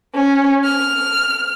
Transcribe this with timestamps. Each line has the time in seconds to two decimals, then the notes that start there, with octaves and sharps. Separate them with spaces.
0.14 C#4
0.64 F6